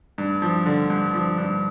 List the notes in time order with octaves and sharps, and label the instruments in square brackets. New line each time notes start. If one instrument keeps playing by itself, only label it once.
[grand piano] G2
F3
D3
G2
F3
G2